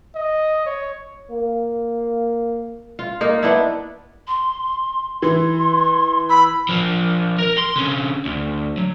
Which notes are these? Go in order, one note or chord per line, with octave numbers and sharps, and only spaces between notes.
D#5
C#5
A#3
F4
A#3 D#4
B3 D4 E4
C6
E3 C6
B5 E6
F3 D4
A#4
C6
D3 C#4
D2
F#3